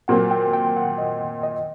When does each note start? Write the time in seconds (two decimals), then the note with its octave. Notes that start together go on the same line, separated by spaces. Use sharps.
0.08 A#2 F#3 C4 F#5
0.31 G5
0.53 G5
0.77 F#5
0.98 D#5
1.43 D#5